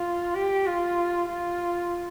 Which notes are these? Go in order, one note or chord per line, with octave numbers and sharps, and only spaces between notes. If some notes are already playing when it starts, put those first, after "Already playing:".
Already playing: F4
G4
F4
F4